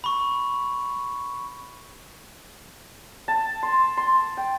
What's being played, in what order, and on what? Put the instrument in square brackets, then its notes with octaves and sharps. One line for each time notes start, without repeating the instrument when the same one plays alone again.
[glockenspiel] B5 C#6
[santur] A5
C6
C6
G5